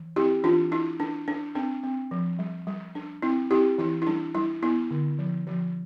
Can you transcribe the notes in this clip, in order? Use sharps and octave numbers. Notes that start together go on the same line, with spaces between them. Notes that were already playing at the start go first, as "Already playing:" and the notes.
Already playing: E3
C4 E4 G4
E3 D4 F4
D4 E4
D4
D4
C4 D4
C4
F3
G3
G3
D4
C4 E4
C4 E4 G4
E3 E4
E4
G3 D4
G3 E4
B3 E4
D3
F3
F3